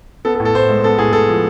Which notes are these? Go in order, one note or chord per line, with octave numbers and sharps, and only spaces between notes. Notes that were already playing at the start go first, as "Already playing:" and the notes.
B3 A4
A4
A2
A4
A2 C5
G#3
B3 A4
A2 G#4
A2 A4
F3